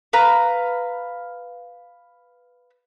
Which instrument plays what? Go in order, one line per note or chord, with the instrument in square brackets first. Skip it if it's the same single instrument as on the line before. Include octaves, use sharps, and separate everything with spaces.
[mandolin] B4 F5 A#5